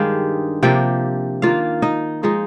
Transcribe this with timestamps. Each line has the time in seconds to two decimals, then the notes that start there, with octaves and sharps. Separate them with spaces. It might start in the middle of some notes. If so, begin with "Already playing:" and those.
Already playing: G2 D#3 G#3 D4 G4 F5 G5
0.63 C3 F3 A#3 D4 G4 G5
1.42 D#3 A#3 D4 F4 F5
1.82 D#4 D#5
2.23 F3 G#3 D#4